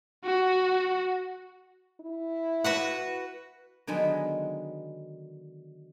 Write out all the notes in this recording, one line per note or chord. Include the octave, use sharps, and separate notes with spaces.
F#4
E4
F#4 B4 F#5
D3 D#3 F#3 G#3 B3